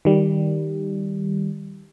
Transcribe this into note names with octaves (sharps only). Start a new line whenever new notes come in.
D#3 G3